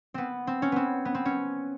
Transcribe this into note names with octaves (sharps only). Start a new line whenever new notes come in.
B3 C4
C4
C#4
B3 C4
B3
C4
C#4